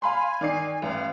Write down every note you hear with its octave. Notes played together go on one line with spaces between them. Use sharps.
F5 G#5 B5 C6
D#3 D5 C7
A1 F5